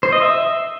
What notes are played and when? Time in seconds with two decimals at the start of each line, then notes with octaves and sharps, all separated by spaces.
0.03 C5
0.12 D#5
0.22 E5